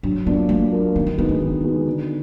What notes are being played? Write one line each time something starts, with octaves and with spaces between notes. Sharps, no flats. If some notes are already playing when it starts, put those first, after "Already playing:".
F#3 D4
A#3 B3 D4 F4 A#4
F#3 A#3
A#3 D4 F4 A#4
D#3 B3
D4
G#3 B3 D4 D#4 F#4
D4
D#3
G#3 B3 D#4 F#4
D3